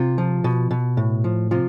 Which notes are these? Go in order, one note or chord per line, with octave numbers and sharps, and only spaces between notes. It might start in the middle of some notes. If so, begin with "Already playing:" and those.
Already playing: C3 F4
F3
B2
B2
A2
F3
C3 F3 F4